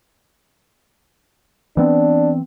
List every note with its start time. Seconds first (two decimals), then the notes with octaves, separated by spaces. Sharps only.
1.77 E3 B3 C4 D4